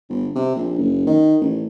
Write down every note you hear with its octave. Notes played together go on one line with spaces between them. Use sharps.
G1
C3
A#1
F#1
D#3
A1